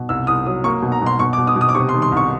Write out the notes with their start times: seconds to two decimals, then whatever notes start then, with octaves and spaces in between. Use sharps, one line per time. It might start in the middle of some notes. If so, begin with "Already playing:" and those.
Already playing: B2
0.09 C2 E6
0.27 C2 D#6
0.46 F#3 D#6
0.64 A#3 C#6
0.82 B2
0.92 A#5
1.01 B2
1.06 C6
1.19 B2 C#6
1.33 D6
1.38 B2
1.47 D#6
1.56 B2
1.61 D#6
1.69 D6
1.75 C3 C#6
1.89 C6
1.94 D#3
2.02 C6
2.12 C2
2.17 C#6